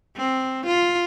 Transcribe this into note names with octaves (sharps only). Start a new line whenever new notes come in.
C4
F4